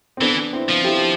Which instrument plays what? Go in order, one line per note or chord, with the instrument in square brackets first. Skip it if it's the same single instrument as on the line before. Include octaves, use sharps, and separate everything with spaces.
[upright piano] C4
[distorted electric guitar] E3 [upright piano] B3 D4
[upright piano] C4 E4
[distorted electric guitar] F3
[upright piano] E4 G4